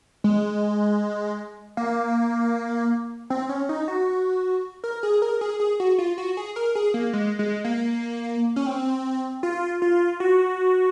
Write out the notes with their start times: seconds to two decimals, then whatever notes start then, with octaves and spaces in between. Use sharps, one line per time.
0.24 G#3
1.77 A#3
3.30 C4
3.49 C#4
3.69 D#4
3.88 F#4
4.84 A#4
5.03 G#4
5.22 A#4
5.41 G#4
5.60 G#4
5.80 F#4
5.98 F4
6.18 F#4
6.37 G#4
6.56 A#4
6.75 G#4
6.94 A#3
7.13 G#3
7.39 G#3
7.64 A#3
8.56 C#4
8.67 C4
9.43 F4
9.82 F4
10.20 F#4